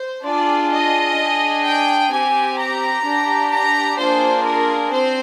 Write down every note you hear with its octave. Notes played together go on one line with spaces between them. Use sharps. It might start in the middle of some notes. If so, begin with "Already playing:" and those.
Already playing: C5
D4 F4 G#4 D5
D#5
D4 G#4
G5
C4 G4 G#5
A#5
D4 G4
A#5
A#3 D4 F4 G#4 C5
A#4
C4 C5